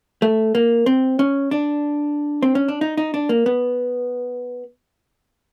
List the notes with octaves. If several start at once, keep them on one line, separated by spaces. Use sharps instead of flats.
A3
A#3
C4
C#4
D4
C4
C#4
D4
D#4
D#4
D4
A#3
B3